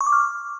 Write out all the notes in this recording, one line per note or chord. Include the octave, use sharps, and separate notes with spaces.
C#6
D6
F6